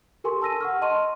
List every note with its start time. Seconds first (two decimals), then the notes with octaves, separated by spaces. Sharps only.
0.24 G4 A4 A#4 G#5 C6 C#6
0.41 A5 E6 A#6 D#7
0.61 F#5 C#6 F6
0.82 D#5 A5 C6 C#6 D#7